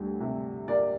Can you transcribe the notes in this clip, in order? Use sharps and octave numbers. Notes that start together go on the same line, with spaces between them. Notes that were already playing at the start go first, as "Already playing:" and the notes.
Already playing: D2 G3
C3
A#3 D5